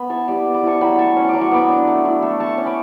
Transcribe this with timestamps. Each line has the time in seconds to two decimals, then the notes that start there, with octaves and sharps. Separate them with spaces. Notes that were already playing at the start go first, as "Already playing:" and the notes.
Already playing: B3 B5
0.10 E4 A5 C#6
0.28 G3 B5 D6
0.46 B3
0.54 B5 D6
0.63 E4 A5 C#6
0.81 F#3 G5 B5
0.98 A3 A5 C#6
1.17 C#4
1.29 F#3 D6
1.41 C#6
1.51 B3 B5 D6
1.69 D4
1.87 A3
2.05 E4
2.22 A3
2.40 A3 A5 C#6
2.58 C#4
2.66 B5 D6